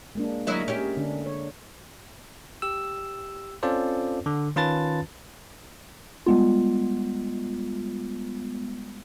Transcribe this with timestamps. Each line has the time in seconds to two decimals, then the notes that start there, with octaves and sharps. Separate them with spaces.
0.15 G#3 A#3 D4
0.47 D2 F#3 E4 A#4 D#5 E5
0.68 C#4 G4
0.97 D3 D4
1.26 C#5
2.62 G4 E6
3.63 C4 C#4 F4 A4 C5 D5
4.26 D3
4.56 D#3 C#4 F4 B4 A5 A6
6.26 G3 G#3 B3 F4